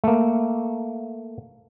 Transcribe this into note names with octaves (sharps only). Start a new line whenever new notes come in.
A3 A#3